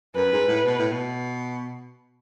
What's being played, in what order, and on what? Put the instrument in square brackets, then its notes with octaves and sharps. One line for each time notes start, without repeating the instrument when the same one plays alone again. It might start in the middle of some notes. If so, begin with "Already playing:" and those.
[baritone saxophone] F#2 [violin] B4
[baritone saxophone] G#2
A2
B2
A2
B2